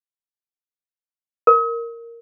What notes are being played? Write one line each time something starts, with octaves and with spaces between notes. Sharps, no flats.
A#4